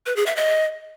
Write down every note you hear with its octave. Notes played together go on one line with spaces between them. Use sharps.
B4
G#4
E5
D#5